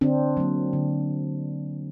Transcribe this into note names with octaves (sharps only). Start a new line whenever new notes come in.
D3 C4 D4
F#3 A#3
D3